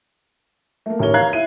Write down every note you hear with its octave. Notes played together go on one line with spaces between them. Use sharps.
A3 A#3
A1 D#2 A#4 C#5 G7
F5 A#5 F#6 G#6 C7
E4 D#7